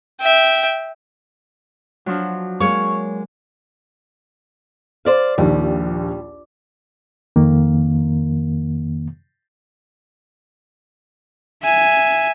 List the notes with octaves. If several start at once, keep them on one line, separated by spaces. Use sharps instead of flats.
E5 G5
F3 F#3 D4
G#3 A#3 C#5
C5 D5 F5
A#1 D#2 G3 G4
F2 D#3 A#3
E5 G#5